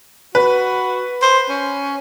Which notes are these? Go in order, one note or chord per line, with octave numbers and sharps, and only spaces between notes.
F#4 B4
C5
C#4